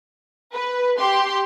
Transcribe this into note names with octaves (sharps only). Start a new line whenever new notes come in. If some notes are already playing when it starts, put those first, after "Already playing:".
B4
G4 C6